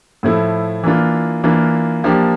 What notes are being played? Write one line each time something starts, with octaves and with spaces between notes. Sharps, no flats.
A2 F3 A3 E4
E3 A#3 D4 F4
E3 A#3 D4 F4
F3 A#3 D4 G4